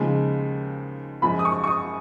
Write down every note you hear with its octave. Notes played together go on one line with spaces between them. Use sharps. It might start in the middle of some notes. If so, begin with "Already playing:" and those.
Already playing: D#2 C#3 F3 G#3
F#2 F3 G#3 B5
D#6
C#6
C#6
D#6